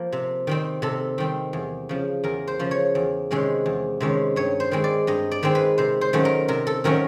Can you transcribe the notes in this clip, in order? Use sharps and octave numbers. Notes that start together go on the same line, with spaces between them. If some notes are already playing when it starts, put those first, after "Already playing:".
Already playing: F3 A#3
C3
D#3 G3 C4
C3 A4
D#3 G3 C4
E2
C#3 F3
E2 A#4
C5
C#3 F3
C#5
E2
C3 D#3 G#3 C#4
E2
C3 D#3 G#3 C#4
G2 C#5
C5
D#3 G#3 C4
D5
G2 D#5
D5
D#3 G#3 C4
B4
C3 C5
C5
D#3 F#3 A3 C#4
A#4
C3 A#4
A4
D#3 F#3 A3 C#4 A#4